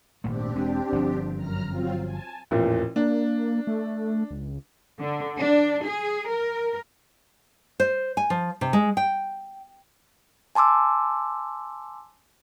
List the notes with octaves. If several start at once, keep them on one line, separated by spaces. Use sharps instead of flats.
G#1 A#2 A3 C4 D4 G4
E1 G#3
G1 F3
F#2 A#5 F6
F#3 C4 F4
G#5 A5
A1 E2 A#2 F3
A#3 D4
A3
C#2
D3
D4
G#4
A#4
C5
G#5
F3
C3
G#3
G5
G#5 A5 C6 D6 E6